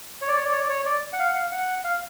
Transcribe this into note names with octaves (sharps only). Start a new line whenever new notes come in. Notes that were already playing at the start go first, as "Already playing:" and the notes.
C#5
D5
C#5
D5
C#5
D5
C#5
D5
F#5
F5
F#5
F5
F#5
F5